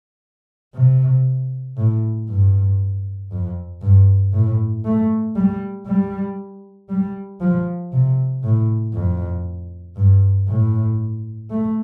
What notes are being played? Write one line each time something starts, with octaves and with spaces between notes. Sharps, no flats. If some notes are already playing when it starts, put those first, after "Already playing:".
C3
A2
G2
F2
G2
A2
A3
G3
G3
G3
F3
C3
A2
F2
G2
A2
A3